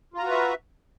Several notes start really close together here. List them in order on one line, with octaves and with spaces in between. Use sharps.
F4 A#5 F#4 B4 E5